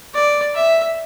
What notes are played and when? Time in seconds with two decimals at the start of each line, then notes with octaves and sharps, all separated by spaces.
0.15 D5
0.55 E5